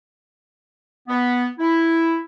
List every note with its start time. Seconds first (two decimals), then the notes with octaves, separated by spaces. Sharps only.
1.08 B3
1.58 E4